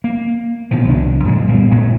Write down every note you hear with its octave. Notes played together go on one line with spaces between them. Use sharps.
A#3
B2 D#3 F3
C2 C#3 D4
F#2 A#2 D3 G#3
A#2 G3 A#3 B3
A#1 A#2 G#3 A3